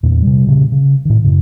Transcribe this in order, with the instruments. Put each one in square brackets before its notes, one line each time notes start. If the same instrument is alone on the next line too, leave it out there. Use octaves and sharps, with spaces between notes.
[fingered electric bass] E2 A#2
C3 G3
A#2 C#3
C#3
A2 D#3
F#2 C#3